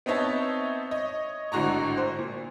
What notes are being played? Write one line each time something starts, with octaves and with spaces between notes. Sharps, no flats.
B3 C4 D#4 C#5 E5 A5
C#5 D#5
G#1 A2 D3 F#4 A#5 C#6
C5
A#2